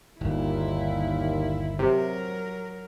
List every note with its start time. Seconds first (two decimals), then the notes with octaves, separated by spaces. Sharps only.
0.21 G1 D#2 A#2 E4
1.79 C3 F#3 A#4